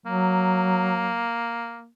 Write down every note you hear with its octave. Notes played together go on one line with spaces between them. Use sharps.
F#3 A#3